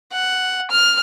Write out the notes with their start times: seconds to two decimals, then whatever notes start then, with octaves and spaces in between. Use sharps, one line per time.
0.12 F#5
0.70 F6